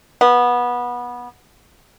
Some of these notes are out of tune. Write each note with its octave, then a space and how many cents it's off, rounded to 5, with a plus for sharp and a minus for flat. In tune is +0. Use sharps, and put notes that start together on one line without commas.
B3 -20